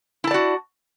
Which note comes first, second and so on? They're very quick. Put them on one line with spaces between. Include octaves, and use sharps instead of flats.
E4 A5 D5 F#4